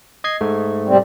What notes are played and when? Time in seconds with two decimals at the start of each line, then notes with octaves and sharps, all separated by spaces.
0.24 D#5 G#6 C7
0.41 G#2 A3
0.88 C3 G3 C4